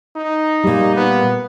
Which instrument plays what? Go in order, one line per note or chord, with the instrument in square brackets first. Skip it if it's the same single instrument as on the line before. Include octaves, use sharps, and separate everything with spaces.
[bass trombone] D#4
[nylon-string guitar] A#2 G3
[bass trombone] B3